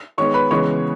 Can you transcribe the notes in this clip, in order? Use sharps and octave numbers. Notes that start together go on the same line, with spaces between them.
D#3 G#3 B3 C#5 C#6
B4 B5
C#3 E3 G#3 B3 C#5 C#6